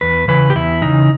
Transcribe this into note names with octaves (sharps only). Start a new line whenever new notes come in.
E2 B4
C#3 E3 B4
G4
E2 E4
C#3 E3 D#4